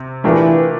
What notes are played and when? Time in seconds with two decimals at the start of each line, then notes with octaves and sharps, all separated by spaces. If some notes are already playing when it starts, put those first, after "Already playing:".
Already playing: C3
0.24 A#2 E3 A3 D4 G4 A#4